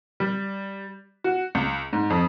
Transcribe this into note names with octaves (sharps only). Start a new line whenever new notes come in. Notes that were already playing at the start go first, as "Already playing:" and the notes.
G3
F#4
C#2
G#2
F2